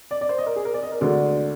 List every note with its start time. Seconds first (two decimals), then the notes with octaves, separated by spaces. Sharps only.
0.11 D5
0.21 D5
0.29 C5
0.38 D#5
0.46 A#4
0.56 G#4
0.65 A#4
0.74 D5
0.83 D#5
0.92 A#4
1.01 D2 D3 G#3 D4 D5